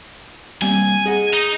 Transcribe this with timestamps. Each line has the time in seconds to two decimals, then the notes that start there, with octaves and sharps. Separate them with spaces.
0.62 G3 A#3 C4 G#5
1.06 G#4 D#5 F#5
1.33 D#4